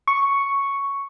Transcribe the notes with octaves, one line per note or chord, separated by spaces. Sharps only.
C#6